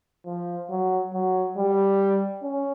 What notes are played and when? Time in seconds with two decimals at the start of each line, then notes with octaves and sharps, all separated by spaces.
0.26 F3
0.70 F#3
1.13 F#3
1.57 G3
2.44 C#4